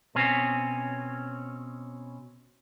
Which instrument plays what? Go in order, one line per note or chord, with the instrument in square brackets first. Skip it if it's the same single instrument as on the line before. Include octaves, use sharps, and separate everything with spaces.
[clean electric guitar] B2 C4 C#4